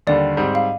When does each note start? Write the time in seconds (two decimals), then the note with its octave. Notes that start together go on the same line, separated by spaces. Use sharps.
0.07 D#2 D3 G3 D5
0.37 G#2 G3 C4
0.55 F5